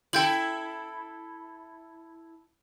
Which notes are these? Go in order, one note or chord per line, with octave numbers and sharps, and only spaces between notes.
E4 A4 G5 G6 F#7